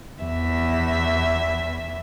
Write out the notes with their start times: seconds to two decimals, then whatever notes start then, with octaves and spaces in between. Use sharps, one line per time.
0.20 E2 E5